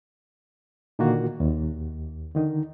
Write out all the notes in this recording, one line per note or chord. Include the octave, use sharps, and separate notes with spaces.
A#2 D3 D#3 A#3 F4 F#4
D#2
D3 D#3 D#4